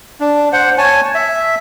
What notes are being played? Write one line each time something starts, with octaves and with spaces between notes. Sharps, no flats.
D4
C5 F#5
C#5 G#5 A5
E5